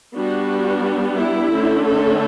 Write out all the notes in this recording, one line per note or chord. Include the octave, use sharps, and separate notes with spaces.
G3 B3 D4 F#4
E4
D3 A3 C#4
A4